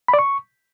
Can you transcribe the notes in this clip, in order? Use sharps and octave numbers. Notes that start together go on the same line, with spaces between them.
B5
D5
C#6